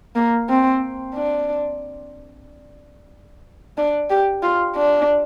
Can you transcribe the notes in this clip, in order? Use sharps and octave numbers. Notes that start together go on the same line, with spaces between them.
A#3
C4
D4
D4
G4
F4
D4